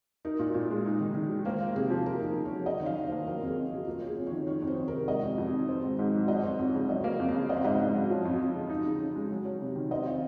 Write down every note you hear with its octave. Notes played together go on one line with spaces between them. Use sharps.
D#4 A#4
A#2
A#2
G#3
D#4
D#3
D#3
G#3
A#3 C5
F4
C3 G#4
F3
A#3 A#4
D#4
C#3
C#5
F#3
C#4 D#5
D#3
F5
D#3
C5
A#3
F#3 A#4
F2
G#4
F2
F#4
C#3
A#3 F4
C#4
G#4
F2
C#5
D#3
D#3 C#5
F2
C5
F2
C3 A#4
G#3 D#5
F2
F2
D#3
C4
G#2
G#2
F#3
F3 D#5
C4 C#5
F2 C5
C#3 C#5
F#3 D#5
A#3
F5
F2
F5
C#3
C4 D#5
F5
G#2 D#5
G#2
F#3
F3
F2
F2
C#3
D#4
C#3
C#3
G#3
F#3
C#4
C3
D#3
C4 D#5
F4